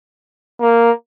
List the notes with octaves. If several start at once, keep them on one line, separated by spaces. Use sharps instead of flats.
A#3